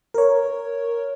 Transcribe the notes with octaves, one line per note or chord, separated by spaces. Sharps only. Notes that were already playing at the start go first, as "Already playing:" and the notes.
A#4 C#5